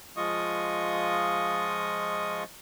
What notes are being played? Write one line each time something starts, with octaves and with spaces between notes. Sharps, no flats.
F3 G#3 F4 D#5 C#6 D#6